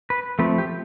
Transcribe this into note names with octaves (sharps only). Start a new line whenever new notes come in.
B4
F3 A3 C4 B4
G4